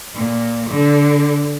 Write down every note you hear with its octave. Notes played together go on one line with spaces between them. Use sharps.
A#2
D3